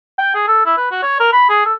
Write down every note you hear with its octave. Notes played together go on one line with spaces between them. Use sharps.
G5
G#4
A4
E4
B4
F#4
C#5
A#4
B5
G#4
A4